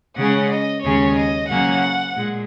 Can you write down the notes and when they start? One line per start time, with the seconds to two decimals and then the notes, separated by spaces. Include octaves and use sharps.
0.17 C#3 G#3 C#4 F#5
0.50 D#5
0.84 D#2 C#3 G#3 C#4 C#5
1.17 D#5
1.49 C#3 F#3 A#3 C#4 F#5
2.16 A#2 G#3